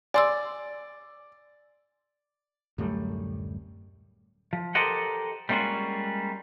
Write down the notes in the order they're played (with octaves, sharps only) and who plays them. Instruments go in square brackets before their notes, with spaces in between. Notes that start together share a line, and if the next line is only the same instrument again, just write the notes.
[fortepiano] D5 [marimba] G#5 C6 E6
[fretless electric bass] D1 F#2 G3 A3
[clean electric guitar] F3
G4 A4 A#4 C5 D#5 F#5
G3 G#3 A#3 C#4 F4 F#4